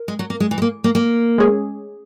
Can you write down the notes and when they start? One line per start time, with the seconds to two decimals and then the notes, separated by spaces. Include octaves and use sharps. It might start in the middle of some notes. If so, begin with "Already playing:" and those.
Already playing: A#4
0.08 G#3
0.19 F#3
0.30 A#3
0.40 G#3
0.51 E3
0.58 G#3
0.62 A#3
0.84 A#3
0.95 A#3
1.38 G#3 C#4 G#4